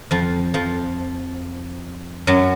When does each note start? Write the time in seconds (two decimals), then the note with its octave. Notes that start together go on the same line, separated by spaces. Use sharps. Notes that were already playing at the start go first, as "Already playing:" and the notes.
0.11 F2 F3
0.54 F2 F3
2.27 F#2 F#3